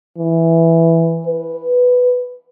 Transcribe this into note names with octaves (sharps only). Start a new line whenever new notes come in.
E3
B4